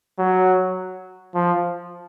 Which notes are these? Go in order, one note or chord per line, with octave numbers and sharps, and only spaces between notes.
F#3
F3